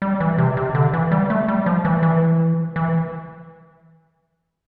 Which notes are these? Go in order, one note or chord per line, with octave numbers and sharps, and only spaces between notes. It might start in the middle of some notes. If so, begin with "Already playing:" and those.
G3
E3
C3
C3
D3
E3
G3
A3
G3
F3
E3
E3
E3